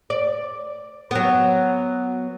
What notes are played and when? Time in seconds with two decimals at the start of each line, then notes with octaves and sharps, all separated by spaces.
0.10 D5
1.11 F#3 B3